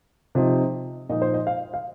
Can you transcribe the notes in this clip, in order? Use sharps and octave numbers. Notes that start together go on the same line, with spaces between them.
C3 F3 D#4
A#2 F3 D#4 D#5
C5
D#5
F5
F5